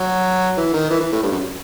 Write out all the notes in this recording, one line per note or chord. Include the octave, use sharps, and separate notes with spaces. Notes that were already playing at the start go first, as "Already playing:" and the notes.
Already playing: F#3
E3
D#3
E3
E3
A2
G2
F#2